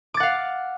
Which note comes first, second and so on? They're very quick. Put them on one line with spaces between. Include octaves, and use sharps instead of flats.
D6 A6 F#5 F5